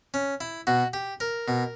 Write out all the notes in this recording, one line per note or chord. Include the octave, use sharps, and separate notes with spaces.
C#4
E4
B2 F#4
G4
A#4
B2